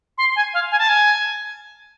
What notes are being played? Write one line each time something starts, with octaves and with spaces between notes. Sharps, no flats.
C6
G#5
F5
G#5
A5
G#5